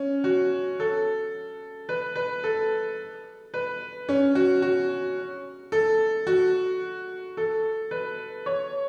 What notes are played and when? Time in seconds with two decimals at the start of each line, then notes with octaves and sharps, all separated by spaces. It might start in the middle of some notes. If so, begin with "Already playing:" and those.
Already playing: C#4
0.24 F#4
0.80 A4
1.89 B4
2.16 B4
2.44 A4
3.54 B4
4.09 C#4
4.35 F#4
4.62 F#4
5.72 A4
6.27 F#4
7.37 A4
7.91 B4
8.46 C#5